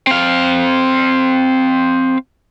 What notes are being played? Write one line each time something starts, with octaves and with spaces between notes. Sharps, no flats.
C4 F5